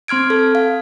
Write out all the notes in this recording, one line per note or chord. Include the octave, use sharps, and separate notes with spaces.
C4 C6 F6 G#6 D7
A4
F5